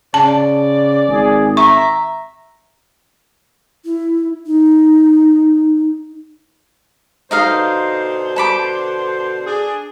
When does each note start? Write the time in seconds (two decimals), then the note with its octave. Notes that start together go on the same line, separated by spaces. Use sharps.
0.14 C#3 D5 A5
1.08 G#1 G#4
1.57 E5 A#5 C#6
3.85 E4
4.46 D#4
7.31 B2 D3 D#4 C5 D#5 F5
8.36 A5 B5 D6
9.46 D4 G#4